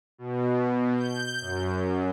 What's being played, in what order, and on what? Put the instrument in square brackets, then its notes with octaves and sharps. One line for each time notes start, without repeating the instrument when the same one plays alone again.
[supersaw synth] B2
G6
F#2